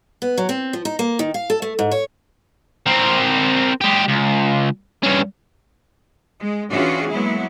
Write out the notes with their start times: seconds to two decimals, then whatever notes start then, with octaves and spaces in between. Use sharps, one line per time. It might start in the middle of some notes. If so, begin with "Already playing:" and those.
0.22 B3
0.38 F#3
0.49 C4
0.73 F3
0.85 D#4
0.99 A#3
1.19 D#3
1.34 F5
1.50 A4
1.62 A3
1.79 G#2
1.91 C#5
2.86 C4 A#4
3.81 G#3 G4
4.08 C#2
5.03 G2 C#4
6.40 G#3
6.71 E3 C#4 D4 F4 F#4 G#4
7.11 F#3 G#3 A#3 B3 E4